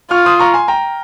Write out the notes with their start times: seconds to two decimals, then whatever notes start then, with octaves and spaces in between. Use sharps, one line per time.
0.11 F4 C#6 F6
0.25 C6 D#6
0.40 A#5 C#6
0.54 G#5 C6
0.68 G5 A#5